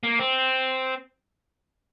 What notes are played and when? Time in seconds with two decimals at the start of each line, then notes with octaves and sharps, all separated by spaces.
0.03 A#3
0.19 C4